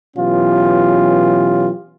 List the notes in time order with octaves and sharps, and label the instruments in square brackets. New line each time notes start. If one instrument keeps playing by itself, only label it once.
[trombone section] B2 E3 F#3 C#4 F4 G4